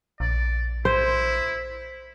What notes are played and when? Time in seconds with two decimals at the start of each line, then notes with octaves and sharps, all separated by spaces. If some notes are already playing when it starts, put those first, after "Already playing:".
0.20 A#1 D5
0.85 E4 C5